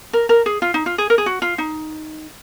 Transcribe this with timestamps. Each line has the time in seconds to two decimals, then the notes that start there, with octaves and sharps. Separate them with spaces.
0.13 A#4
0.29 A#4
0.46 G#4
0.62 F4
0.74 D#4
0.86 F4
0.98 G#4
1.10 A#4
1.18 G#4
1.26 F#4
1.42 F4
1.58 D#4